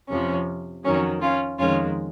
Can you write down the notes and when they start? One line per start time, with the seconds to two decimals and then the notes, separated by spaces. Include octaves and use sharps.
0.09 F2 C3 F3 C#4
0.84 F2 D#3 F#3 C#4
1.22 C#4 F4
1.59 F2 D#3 G#3 C#4 F4